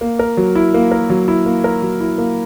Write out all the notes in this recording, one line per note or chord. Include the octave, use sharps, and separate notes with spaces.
A#3
A#4
F#3
E4
A#3
A#4
F#3
E4
A#3
A#4
F#3
E4
A#3